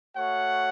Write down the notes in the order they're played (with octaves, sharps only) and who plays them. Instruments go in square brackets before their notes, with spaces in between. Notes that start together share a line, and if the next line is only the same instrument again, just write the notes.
[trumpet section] A3 F#4 C#5 F#5